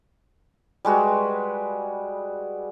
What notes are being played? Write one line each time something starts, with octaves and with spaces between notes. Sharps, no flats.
G3 G#3 F#4 B4